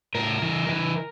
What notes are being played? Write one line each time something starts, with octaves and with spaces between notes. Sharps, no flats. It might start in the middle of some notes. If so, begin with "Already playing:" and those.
A2 A#4
E3
E3